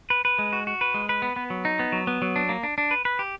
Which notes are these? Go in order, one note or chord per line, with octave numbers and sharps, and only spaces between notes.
B4
B4
G#3
F#4
F#4
B4
G#3
B4
B3
B3
F#3
D#4
B3
F#3
B3
F#3
D4
A#3
D4
D4
B4
B4
G4